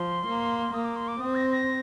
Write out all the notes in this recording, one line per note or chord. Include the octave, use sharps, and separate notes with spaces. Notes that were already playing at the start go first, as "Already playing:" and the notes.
Already playing: F3 C6
A#3
A#3 D#6
D6
C6
D6
C4 D#6
A#6
A#6